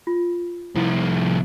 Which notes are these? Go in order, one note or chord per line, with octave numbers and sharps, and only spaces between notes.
F4
C2 F3 E4